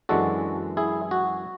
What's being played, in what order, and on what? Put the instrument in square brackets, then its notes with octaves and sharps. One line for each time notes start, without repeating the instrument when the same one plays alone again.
[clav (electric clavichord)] F#2 E3 G#3 D4 F#4 A4
E4 G#4
F#4